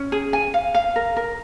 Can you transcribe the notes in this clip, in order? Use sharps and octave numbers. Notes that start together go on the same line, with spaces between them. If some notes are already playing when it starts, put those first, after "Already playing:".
Already playing: C#4
G#4
G#5
F5
F5
A#4
A#4